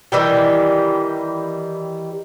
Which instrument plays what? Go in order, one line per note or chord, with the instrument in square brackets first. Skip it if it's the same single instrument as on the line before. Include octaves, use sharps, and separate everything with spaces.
[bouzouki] D#3 E3 G3 G4